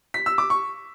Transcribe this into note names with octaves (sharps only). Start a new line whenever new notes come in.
B6
E6
D6
C#6